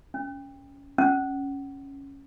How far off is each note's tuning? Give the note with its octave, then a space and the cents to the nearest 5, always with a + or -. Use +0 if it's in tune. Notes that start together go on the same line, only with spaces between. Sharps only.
C#4 +15
C#4 -5